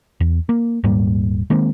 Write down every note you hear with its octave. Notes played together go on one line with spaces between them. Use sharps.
E2
A#3
D#1 G#2 G3 A#3
D#3 G#3 A#3 C4